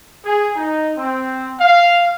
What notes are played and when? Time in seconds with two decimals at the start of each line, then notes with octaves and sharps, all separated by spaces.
0.24 G#4
0.54 D#4
0.97 C4
1.59 F5